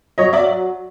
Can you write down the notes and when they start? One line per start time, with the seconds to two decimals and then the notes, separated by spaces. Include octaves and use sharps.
0.18 F#3 C#5 D#5
0.33 D5 E5